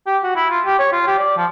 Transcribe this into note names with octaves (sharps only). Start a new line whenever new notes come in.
G4
F#4
E4
F4
G4
C#5
F4
G4
D5
F3